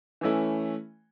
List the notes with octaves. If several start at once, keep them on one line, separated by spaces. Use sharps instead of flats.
E3 A3 C#4 E4